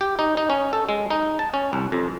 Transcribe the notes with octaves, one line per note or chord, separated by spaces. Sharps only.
G4
D#4
D#4
C#4
A4
G#3
D#4
A5
C#4
C2
F2